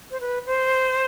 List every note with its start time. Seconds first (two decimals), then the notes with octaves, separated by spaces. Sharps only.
0.11 C5
0.20 B4
0.46 C5